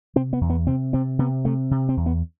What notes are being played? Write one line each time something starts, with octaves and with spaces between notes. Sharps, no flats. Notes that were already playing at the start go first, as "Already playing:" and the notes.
C3 C4
B3
E2
B3
C3 C4
C3 C4
C3 B3
C3 A3
C3
C4
E2
B3